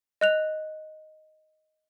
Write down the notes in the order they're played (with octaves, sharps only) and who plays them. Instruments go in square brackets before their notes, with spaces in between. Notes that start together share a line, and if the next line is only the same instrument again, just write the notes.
[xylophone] D#5 F#6 F7